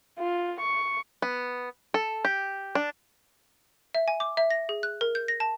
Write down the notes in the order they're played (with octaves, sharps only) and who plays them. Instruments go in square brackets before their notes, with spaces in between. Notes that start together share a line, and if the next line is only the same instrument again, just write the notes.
[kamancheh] F4
C#6
[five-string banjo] B3
A4
G4
D4
[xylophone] E5
G#5
D6
E5
A#6
G#4
F#6
A#4
G6
A#6
A5